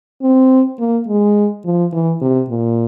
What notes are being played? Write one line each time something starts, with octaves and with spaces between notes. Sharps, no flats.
C4
A#3
G#3
F3
E3
C3
A#2